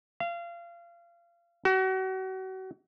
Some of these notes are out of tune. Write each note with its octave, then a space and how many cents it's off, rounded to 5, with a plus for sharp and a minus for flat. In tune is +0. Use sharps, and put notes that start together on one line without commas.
F5 -30
F#4 +35